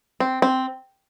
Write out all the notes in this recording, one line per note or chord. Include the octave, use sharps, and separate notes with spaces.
C4
C4